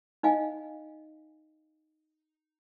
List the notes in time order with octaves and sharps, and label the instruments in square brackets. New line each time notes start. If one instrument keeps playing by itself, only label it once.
[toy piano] D#4 D#5 F5 G#5